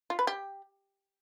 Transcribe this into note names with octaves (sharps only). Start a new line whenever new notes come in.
F4
B4
G4